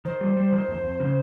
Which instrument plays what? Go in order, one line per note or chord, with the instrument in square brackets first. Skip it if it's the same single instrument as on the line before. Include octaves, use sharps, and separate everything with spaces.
[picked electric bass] D#3 [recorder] C5
[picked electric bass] G3
G3
D#3
F2
F2
C#3